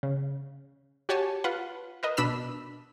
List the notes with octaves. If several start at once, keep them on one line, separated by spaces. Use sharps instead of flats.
C#3
F#4 G4 C#5 G#5 A5
F4 B4 F#5
A#4 B4 D#5
B2 D4 B5 E6 B6 E7